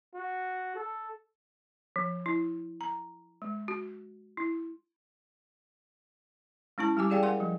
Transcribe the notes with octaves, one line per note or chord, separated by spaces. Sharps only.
F#4
A4
F3
E4
A#5
G#3
F#4
E4
G#3 C#4 E4 A5
G3 G4 G#5 D6
G4 G#4 D5 F5 G5 G#5
A#4 F5 F#5 G#5 C6
F3